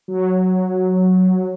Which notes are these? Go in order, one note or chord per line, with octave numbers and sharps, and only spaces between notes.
F#3